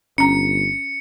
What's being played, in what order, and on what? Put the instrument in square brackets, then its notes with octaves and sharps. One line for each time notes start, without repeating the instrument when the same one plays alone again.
[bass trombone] G1 [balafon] C#4 A#5 [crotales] C#7